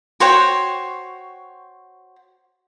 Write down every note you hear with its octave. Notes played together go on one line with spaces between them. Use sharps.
F#4 C5 C#5 G5